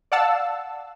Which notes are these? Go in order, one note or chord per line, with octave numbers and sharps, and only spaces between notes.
D5 F5 F#5 A5 E6